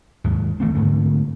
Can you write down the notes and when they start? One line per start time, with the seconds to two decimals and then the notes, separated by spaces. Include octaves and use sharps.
0.24 D#2 G#2
0.60 E3 F#3 A3 C4
0.75 G#2 D3 A3